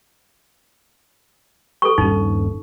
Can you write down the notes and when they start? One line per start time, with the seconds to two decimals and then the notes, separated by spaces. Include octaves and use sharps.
1.82 A4 B4 C#6
1.98 D#1 G2 C#4 D#4